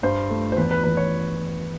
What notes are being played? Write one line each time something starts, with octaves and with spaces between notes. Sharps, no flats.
G2 C5
A3
C5
E2 B4
B4
E2 B4
C#5